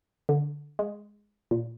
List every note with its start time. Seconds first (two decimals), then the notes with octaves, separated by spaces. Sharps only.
0.29 D3
0.79 G#3
1.51 A#2